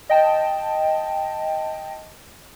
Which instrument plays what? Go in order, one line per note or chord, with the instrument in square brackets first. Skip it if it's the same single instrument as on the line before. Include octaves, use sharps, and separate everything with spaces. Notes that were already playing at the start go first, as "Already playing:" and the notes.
[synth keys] D#5 G5 A5